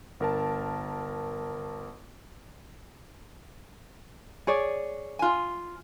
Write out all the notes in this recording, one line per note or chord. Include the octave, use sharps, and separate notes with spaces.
G1 A#4 A5
G#4 C#5 D5
F4 G#5